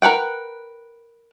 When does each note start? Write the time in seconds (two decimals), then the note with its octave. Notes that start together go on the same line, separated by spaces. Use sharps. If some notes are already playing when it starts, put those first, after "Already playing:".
0.02 A#4 B4 F#5 G5